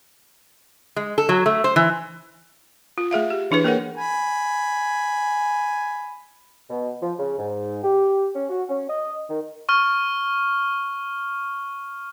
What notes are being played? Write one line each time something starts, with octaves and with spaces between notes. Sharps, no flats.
G#3
A4
F#3
A3
C5
E3
F4
A3 G#4 E5 F5
G4
E3 D4 E4 G#4 B4
A#3 G#4 A#4 C#5 F#5
G#5 B5
B2
F3
C#3
G#2
G4
C#4
F#4
C#4
D#5
D#3
C#6 F6